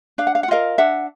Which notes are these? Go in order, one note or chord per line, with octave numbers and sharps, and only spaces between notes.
D4 F5
F#5
F5
F#5
F4 A#4 D#5 F5
D4 E5 F#5